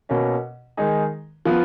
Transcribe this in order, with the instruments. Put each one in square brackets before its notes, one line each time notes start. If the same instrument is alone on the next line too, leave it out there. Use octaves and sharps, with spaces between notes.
[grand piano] B2 A#3 C#4
D#3 G#3 D#4 G#4
F3 B3 F4